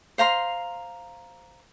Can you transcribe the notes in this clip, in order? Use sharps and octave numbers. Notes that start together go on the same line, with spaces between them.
C5 F5 A#5 C6